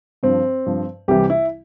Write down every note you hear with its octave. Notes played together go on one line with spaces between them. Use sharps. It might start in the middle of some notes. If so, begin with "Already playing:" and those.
G2 F3 C4
G2 F3
C2 C3 E3 G3 G4
E4